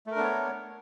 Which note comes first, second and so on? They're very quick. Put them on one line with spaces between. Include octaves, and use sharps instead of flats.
A3 A#4 D4 B3 C#5